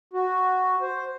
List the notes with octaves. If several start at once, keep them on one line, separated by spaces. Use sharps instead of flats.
F#4
C5